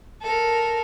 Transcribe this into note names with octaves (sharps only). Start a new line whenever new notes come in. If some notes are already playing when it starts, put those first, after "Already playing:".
A4 A#4